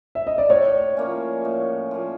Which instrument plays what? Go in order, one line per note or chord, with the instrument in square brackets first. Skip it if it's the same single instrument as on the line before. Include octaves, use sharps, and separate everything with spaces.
[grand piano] E5
D#5
D5
[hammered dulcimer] A2 [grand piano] C#5
[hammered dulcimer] F3 A#3 C#4
A2
F3 A#3 C#4